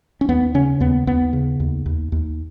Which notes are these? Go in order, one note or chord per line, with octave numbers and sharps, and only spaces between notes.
C#4
D#2 B3
C#3 C#4
D#2 B3
D#2 B3
C#3
D#2
D#2
D#2